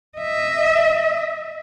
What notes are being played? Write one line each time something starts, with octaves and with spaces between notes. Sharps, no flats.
D#5 E5